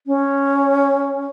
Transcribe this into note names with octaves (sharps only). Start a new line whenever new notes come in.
C#4